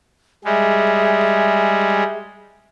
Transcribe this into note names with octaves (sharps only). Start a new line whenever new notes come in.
G3 G#3 G#4 E5